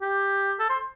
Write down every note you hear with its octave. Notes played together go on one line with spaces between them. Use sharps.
G4
A4
C5